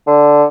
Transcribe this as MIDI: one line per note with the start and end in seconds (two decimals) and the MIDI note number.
0.07 0.44 50